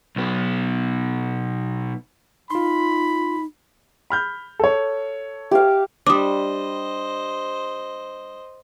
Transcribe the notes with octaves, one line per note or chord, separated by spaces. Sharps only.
B1 B3
D#4 F4 B5 C6
B5 F6 G6
A4 C#5
G4 F5
G3 D4 C5 D#5 D6 D#6